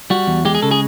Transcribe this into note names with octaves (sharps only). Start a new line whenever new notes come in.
G3 F#4
E2
G#3 G4
G#4
C#3 A4
G#4